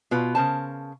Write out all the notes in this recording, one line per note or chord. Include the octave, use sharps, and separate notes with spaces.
B2 F4 B4
C#3 A#4 C5 A5